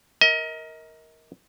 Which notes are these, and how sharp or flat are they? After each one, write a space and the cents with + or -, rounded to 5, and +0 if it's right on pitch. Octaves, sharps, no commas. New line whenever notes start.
A#4 +0 D#5 +35